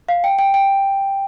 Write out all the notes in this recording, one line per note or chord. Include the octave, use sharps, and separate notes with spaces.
F5
G5
G5
G5